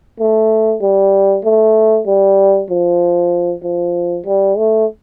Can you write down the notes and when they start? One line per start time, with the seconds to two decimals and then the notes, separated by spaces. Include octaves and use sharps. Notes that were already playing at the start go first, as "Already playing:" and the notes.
0.20 A3
0.82 G3
1.44 A3
2.06 G3
2.70 F3
3.63 F3
4.26 G3
4.57 A3